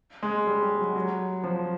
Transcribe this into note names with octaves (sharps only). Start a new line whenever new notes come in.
G#3
G3
G3
F#3
F#3
F3